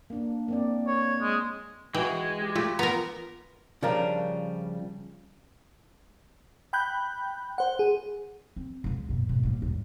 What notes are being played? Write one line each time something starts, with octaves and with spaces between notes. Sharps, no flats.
A#3 D4
A#3 C4 D5
C#5
G#3
E3 G#3 F#4 G5
G4
A3 F4 G4
B3 A#4 A#5
C#3 F3 G3 D4 A#4
G5 B5 F#6 G6
C5 F#5
G#4
C4
C#2 F4
F#2 A#2
G#2 B2
A#1 G3
E2 G#2